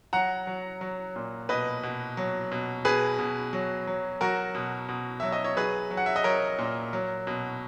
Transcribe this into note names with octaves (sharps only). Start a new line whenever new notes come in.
F#3 F#5 A#5
F#3
F#3
A#2
B2 B4 D#5
B2
F#3
B2
B2 G#4 B4
B2
F#3
F#3
F#3 F#4 A#4
B2
B2
F#3 E5
D#5
C#5
F#3 G#4 B4
F#3
F#5
E5
D#5
F#3 A#4 C#5
A#2
F#3
B2